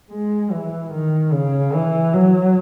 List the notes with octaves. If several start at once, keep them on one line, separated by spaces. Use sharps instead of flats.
G#3
E3
D#3
C#3
E3
F#3